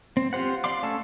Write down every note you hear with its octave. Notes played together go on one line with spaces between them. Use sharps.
C4
F4 G4 C5 F#5
D5 F5 C6 D6
A3 C#4 A5 C#6 E6